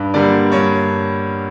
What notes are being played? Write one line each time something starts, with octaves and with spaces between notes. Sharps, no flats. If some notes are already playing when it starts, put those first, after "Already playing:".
Already playing: G2
D3 G3 A#3 D5
G2 C#5